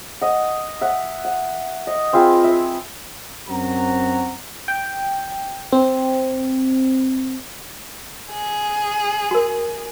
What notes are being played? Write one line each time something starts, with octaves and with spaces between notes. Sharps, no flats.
D#5 F#5
E5 F#5
F#5
D#5
C4 F4 G#4 B4
E5
F#2 C4 F#4 A#5
G5
C4
G#4
F#4 A#4